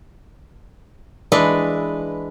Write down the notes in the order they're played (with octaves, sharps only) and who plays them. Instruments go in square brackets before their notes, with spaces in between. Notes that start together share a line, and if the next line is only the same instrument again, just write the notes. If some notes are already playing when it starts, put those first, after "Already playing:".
[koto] E3 G#3 D4 B4